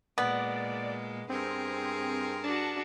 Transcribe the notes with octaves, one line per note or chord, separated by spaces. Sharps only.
A#2 G#3 B3 D5
G2 C4 G#4 A#4
D4 F#4 A5